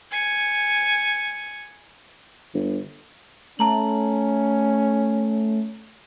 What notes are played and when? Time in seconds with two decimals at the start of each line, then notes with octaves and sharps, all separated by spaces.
0.11 G#5 C#7
2.54 G1
3.59 A3 C#4 A5 A#5 F#7